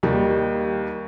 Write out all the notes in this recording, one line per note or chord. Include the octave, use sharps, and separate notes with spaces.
D#2 D#3 G3